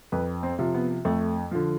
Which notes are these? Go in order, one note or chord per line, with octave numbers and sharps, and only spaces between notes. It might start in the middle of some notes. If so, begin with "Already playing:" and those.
F2 B4
C4
C3 F3
B3
F2 A3
D3 F3